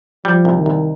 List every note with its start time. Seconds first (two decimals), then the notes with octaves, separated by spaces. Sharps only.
0.25 F3 G3
0.45 C2
0.55 D#3
0.66 C2